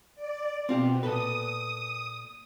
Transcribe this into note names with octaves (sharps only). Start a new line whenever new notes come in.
D5
B2 C4 F4 G4
A#2 A4 B4 D#6